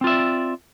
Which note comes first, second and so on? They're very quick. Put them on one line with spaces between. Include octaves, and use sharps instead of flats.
C4 F4 E5 D5